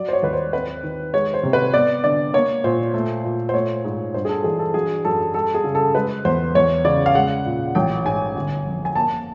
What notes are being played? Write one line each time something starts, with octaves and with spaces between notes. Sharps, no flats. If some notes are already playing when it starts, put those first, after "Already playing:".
Already playing: F#3 D5
C5
C#5
D#2 B4
C5
C4 B4
D#3
G#3 C#5
C5
C3
B4
B3 D5
D3 D5
A#3 C#5
A#2 C5
A3
A#2
C5
A3 C#5
G#2
G2 C5
G#4
A4
E3 G#4
A4
F#3 G#4
F#2 A4
G3 A4
G#4
C#3
A4
G#3 B4
E2 C5
E2 C#5
C#3 D5
F5
G#3 F#5
A#2
A1 G5
G#2 G#5
G1
F2
G#5
A#3 A5